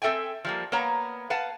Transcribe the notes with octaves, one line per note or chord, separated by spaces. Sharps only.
C4 A4 E5 G5 G#5
F3 G3 A#3
A#3 B3 C#5 A#5
B4 F5 F#5 A5